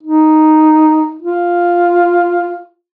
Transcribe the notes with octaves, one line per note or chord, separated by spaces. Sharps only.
D#4
F4